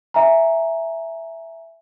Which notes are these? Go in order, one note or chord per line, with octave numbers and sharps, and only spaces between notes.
E5 G#5 A#5